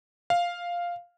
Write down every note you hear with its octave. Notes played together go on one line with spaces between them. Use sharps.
F5